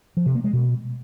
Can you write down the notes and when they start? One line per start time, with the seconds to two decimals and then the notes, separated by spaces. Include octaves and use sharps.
0.17 F3
0.26 C3
0.35 A#3
0.44 G#3
0.53 B2